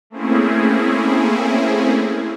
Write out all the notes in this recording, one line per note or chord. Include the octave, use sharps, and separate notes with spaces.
A3 A#3 C4 C#4 E4 G#4